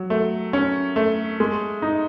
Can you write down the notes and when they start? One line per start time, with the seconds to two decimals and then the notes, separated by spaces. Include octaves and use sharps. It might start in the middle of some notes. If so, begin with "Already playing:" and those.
Already playing: F#3
0.10 A3
0.53 C#4
0.96 A3
1.40 G#3
1.82 D#4